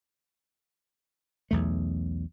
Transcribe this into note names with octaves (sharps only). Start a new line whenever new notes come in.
B1 E2 A3